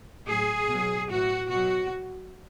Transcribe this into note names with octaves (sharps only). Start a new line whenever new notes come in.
A2 F#3 G#4
B2 F#3
A2 E3 F#4
B2 F#3 F#4